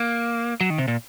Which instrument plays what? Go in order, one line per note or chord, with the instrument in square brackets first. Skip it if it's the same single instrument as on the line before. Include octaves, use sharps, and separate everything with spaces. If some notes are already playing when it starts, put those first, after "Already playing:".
Already playing: [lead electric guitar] A#3
F#3
D#3
C3
A#2